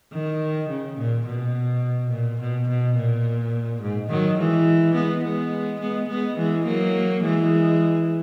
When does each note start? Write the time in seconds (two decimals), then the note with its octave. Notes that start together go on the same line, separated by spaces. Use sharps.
0.12 D#3
0.69 C#3
0.97 A#2
1.26 B2
2.11 A#2
2.40 B2
2.68 B2
2.96 A#2
3.82 G#2
4.10 D#3 F#3
4.38 E3 G#3
4.95 G#3 B3
5.24 G#3 B3
5.80 G#3 B3
6.09 G#3 B3
6.37 E3 G#3
6.66 F#3 A#3
7.23 E3 G#3